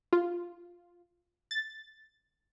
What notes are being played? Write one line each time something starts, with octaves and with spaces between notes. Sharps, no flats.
F4
A6